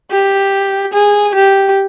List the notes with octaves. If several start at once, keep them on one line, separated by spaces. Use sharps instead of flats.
G4
G#4
G4